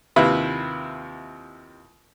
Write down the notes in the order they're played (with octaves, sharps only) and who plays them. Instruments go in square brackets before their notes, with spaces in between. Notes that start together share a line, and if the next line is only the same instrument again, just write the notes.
[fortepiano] D#2 C3 E4 F4 B4